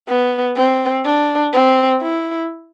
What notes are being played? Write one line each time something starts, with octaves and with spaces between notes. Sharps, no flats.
B3
C4
D4
C4
E4